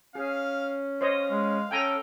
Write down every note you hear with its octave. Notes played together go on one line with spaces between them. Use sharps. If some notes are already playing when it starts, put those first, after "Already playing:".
C#4 G#4 F5
C5 C#5 D#5 F5
G#3
C#4 A4 G5 G#5 A#5